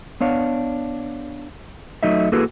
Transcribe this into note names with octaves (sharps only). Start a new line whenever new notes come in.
B3 D4 C#5 F5
F#3 A3 D#4 D#5 E5
A#3 E4 F#4 G#4 A4 B4